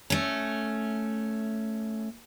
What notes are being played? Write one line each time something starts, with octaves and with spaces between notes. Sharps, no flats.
A3 C#4